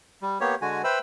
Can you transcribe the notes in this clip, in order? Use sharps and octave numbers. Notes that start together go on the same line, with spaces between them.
G3
A#3 B3 G4 C#5
D3 G#3 F#4 G#5
B4 C5 E5 G5 B5 E6